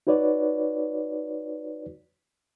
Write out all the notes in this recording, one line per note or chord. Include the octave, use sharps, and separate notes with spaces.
D#4 F#4 B4 C#5 D5